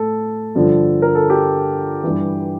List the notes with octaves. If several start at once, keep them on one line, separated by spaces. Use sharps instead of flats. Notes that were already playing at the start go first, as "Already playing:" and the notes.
Already playing: A2 A4
G2 D3 F3
A#4
A4
G4
G2 E3